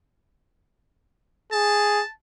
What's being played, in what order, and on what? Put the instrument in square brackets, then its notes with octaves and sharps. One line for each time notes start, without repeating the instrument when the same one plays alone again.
[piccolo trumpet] G#4 [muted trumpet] A5